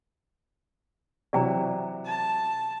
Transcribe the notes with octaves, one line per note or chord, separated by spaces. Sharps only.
C3 E3 F#3 D5 G5 A#5
A5